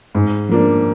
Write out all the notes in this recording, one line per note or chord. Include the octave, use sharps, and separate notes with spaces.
G#2
F3 A#3 D4